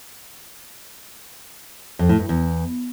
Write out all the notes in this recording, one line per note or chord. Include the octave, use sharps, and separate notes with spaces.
F2
A2
G2
E2